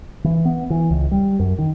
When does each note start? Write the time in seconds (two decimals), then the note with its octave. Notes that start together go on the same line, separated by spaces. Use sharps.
0.24 E3
0.45 B3
0.70 E3
0.90 C#2
1.11 G3
1.39 F#2
1.59 D#3